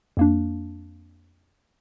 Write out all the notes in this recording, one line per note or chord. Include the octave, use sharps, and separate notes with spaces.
F2 A#3 D4